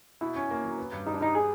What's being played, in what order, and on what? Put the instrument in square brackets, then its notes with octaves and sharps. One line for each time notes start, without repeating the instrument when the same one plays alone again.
[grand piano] B2 [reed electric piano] E4
[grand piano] C#4
A#3
F#3
B3
G2
[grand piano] G3 [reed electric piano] D#4
[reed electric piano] D4
[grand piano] G3 [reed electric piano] D#4
[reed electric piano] G#4